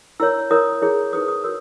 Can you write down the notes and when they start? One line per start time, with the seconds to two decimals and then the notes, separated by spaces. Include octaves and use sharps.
0.20 E4 A#4 C#5 E6
0.51 E4 A#4 C#5 D#6
0.82 E4 G#4 C#5
1.13 D#4 G#4 B4 D#6
1.28 D#6
1.44 F#4 A#4 C#5 E6